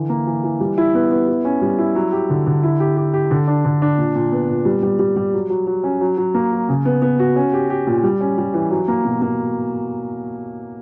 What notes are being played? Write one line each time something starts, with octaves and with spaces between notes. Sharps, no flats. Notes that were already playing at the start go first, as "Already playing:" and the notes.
Already playing: D3 E3
A#3
E3
E3
G3
E4
B3
B3
E4
C#4
G3
E4
F#3
G4
D3
D3
E4
G4
G4
G4
D3
D4
D3
D4
A#2
A#2
B3
A#2
G3
G3
G3
G3
F#3
F#3
F#3
C#4
F#3
F#3
A#3
F#3
C#3
B3
B3
F#4
C#4
G4
G4
A#2
G3
C#4
G3
E3
F#3
A#3
B2
A#3